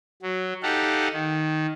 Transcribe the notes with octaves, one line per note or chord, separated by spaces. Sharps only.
F#3
D#4 G4 A4 F5 F#5
D#3